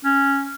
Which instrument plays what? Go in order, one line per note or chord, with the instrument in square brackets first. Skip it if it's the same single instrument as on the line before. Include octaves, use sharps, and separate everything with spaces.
[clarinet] C#4